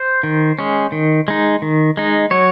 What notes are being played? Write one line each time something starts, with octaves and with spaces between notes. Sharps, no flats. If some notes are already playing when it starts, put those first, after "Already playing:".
Already playing: C5
D#3
G#3 C#4
D#3
G#3 D#4
D#3
G#3 D#4
F#3 C#5